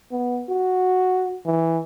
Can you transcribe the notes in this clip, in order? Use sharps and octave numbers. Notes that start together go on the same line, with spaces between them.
B3
F#4
E3